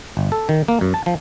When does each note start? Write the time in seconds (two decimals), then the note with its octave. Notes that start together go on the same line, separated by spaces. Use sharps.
0.17 G1
0.32 A4
0.49 D#3
0.68 A#3
0.81 F#2
0.94 A5
1.06 F3